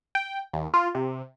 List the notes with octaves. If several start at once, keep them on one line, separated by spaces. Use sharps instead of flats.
G5
D#2
F4
C3